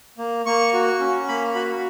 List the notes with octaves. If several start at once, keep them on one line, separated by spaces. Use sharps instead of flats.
A#3
A#3 C#6
F#4
C#4
A#3 B5
F#4 B5